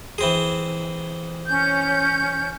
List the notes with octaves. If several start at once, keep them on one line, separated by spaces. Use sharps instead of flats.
E3 C4 G#4
C#4 G6